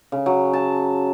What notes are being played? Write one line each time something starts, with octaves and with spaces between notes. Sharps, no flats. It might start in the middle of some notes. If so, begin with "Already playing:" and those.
C#3
F#3
A5